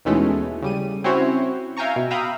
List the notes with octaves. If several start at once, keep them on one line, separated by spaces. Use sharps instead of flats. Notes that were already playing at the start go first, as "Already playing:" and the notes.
D#2 B2 E3 G#3 A3 C#4
C#3 G3 D#7
C4 C#4 E4 F#4 C5 C#5
E5 F5 G5 G#5 A#5 C#6
B2
E5 F5 G5 A#5 B5 D#6